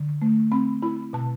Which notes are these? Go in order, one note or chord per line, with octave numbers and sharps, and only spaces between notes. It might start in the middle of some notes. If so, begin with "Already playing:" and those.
Already playing: D3
A3
C4 B5
E4 B5
B2 A5